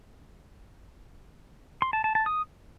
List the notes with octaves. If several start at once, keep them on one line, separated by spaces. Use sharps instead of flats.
C6
A5
A5
A5
D#6